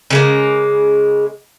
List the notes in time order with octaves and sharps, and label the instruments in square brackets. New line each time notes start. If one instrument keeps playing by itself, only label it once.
[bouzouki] C#3 G#3 A#3